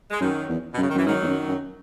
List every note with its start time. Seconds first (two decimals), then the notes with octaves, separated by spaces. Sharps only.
0.11 G#3
0.20 F#2 D#3 F#3
0.49 E2
0.73 B2
0.78 F#2 C#3
0.90 D#3
0.95 F#2 E3
1.05 G#2 D#3 F#3
1.23 E2
1.27 F#2
1.49 F#2